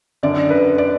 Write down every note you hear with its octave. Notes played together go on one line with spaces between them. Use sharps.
F#2 D3 D5
B4
D5